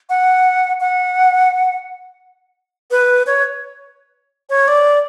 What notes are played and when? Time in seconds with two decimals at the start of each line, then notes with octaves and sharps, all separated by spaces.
0.10 F#5
0.80 F#5
2.91 B4
3.27 C#5
4.50 C#5
4.68 D5